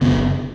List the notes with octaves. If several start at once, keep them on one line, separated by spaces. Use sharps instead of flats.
F#1 F#2 C#3 B3